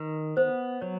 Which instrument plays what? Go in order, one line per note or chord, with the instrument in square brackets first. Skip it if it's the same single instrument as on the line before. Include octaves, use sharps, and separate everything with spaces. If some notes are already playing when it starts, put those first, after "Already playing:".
Already playing: [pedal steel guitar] D#3 [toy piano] B4
[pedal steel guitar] B3 [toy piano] C5
[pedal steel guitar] F#3 [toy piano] C#5